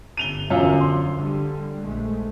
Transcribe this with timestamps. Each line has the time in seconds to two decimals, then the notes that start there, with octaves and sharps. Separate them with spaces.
0.17 G1 D#7 F7 G7
0.50 E1 F#2 D3 F3 F4
0.81 C6
1.17 D3 G3
1.82 A#1 G#3 A3